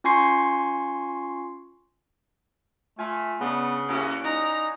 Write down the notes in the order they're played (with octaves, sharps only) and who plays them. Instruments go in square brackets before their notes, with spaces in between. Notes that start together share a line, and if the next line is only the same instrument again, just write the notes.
[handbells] C#4 F4 G#5 C6 C#6 C7
[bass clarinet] A3 [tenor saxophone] F4 [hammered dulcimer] G#5
[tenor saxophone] C#3 [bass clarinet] B3 [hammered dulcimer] D4 B4
[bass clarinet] D#2 [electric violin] A#3 C#4 [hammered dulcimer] E4 F#4 G#4
[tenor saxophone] D#4 [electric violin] A#5